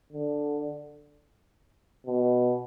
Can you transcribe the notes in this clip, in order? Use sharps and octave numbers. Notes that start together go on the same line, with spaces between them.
D3
B2